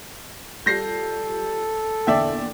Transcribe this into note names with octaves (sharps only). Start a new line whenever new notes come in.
G3 F4 A4 G6 A#6 C7
E2 A#2 D3 D5 E5 G5